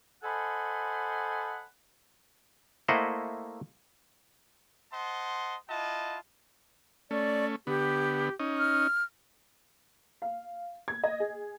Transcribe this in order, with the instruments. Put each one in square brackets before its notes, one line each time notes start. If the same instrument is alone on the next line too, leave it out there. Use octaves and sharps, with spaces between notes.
[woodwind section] A4 C5 D#5 F#5 G#5 B5
[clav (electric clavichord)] A3 A#3 E4 C5 D#5 F#5
[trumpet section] C5 D#5 F#5 A5 C6
E4 F4 D#5 F#5 A5
[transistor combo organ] A3 C#4 [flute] D5
[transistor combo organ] D3 B3 [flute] G4
[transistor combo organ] C#4 D#4
[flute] F6
[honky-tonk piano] F5
G#6
D#5
G#4